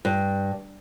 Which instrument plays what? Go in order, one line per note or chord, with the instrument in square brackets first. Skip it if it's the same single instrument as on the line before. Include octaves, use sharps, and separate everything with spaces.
[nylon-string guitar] G2